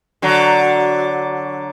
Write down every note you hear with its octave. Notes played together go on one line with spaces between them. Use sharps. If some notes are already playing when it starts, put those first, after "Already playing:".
D3 F#3